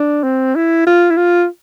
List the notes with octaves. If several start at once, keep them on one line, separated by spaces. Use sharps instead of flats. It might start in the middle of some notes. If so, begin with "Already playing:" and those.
Already playing: D4
C4
E4
F4
E4
F4